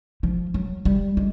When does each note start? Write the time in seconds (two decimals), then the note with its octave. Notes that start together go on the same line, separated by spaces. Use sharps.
0.23 F3
0.54 F#3
0.85 G3
1.17 G#3